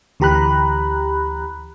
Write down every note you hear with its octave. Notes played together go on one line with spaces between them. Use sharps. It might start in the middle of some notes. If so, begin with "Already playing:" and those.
D2 E3 G4 A#5 B5 F#6